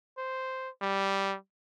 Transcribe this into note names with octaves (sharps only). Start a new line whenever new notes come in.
C5
G3